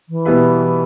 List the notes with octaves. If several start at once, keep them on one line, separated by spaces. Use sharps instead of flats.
E3
B2 G3 B3 E4 B4